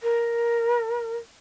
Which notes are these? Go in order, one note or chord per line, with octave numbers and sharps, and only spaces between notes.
A#4